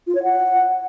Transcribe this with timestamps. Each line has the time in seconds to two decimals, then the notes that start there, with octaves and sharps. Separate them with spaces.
0.07 F4
0.15 C#5
0.23 F#5